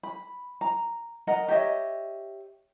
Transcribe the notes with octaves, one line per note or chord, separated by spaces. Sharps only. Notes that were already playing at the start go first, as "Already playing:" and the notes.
B5
A#5
A#4 D#5 F#5 A#5
G4 C#5 D#5 E5